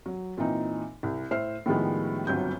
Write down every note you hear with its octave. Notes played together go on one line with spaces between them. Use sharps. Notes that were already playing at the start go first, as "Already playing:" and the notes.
F#3
A#2 E3 C4 D#4
C2
A2 C5 E5 F6 C7
A2 D#3 F3 G3 G#3 B3
G1 D2 F#3 C4 G6